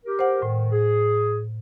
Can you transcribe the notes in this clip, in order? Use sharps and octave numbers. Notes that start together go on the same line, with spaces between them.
G4 A#4
C5 F#5
A2 D#3
G#4